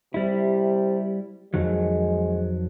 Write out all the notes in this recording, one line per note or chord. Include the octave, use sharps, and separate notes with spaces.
C3 G3 E4
F2 D#3 F#3 G#3